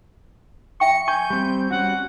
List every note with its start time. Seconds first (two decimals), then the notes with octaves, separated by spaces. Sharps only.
0.80 E5 G5 C#6 C#7
1.08 G#5 C#6 G6
1.30 G3 C4
1.71 G3 C#4 F#4 F#5